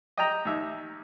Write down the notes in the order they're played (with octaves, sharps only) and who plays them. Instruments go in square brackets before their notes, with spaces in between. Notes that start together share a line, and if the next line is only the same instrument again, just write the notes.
[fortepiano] D#5 G5 A#5
D#2 E5